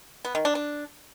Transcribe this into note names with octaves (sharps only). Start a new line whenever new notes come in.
B3
D#3
D4
D4